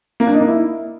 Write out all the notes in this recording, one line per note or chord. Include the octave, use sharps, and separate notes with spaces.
A#3
D4
D#4
A#3
E4